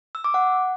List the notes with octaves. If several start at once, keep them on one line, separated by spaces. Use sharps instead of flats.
E6
D6
F#5